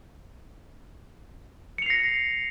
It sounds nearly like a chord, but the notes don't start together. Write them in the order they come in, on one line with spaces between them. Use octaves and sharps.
C#7 F7 C7 A#6